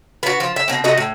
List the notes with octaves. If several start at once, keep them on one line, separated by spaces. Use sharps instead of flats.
B3 F4 F#4
F3
E5
B2 C4
C3 A3 F#4 D#5
A2